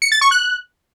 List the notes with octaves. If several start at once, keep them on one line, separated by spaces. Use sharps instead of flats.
C#7
A6
C#6
F#6